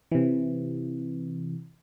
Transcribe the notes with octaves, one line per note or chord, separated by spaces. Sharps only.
C3 E3